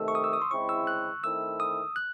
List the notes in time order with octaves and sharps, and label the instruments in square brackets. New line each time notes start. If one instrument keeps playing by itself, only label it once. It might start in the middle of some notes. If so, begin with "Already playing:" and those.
Already playing: [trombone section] C3 D#3 A3 [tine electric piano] E6
[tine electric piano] C#6
D#6
E6
D#6
C6
[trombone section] C#3 G#3 C4 E4 [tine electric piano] C#6
[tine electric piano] E6
F#6
[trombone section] D#3 A3 C4 E4 [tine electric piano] E6
[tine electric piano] D#6
F#6